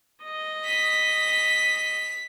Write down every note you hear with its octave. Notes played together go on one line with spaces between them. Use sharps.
D#5
B6